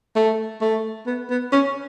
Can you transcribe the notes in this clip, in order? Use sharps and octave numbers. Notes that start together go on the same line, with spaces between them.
A3
A3
B3
B3
C#4